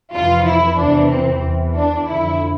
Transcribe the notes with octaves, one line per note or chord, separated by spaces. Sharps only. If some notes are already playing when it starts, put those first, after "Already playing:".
F2 C3 E3 F4
E4
E2 C3 E3 D4
C4
E2 E3
D4
F2 D3 E4